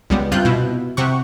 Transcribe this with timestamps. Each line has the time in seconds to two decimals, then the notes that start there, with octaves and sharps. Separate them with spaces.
0.10 C#2 G3 B3
0.32 G2 C3 F4 F#6 G6
0.45 B2 E4
0.97 C3 F#5 C#6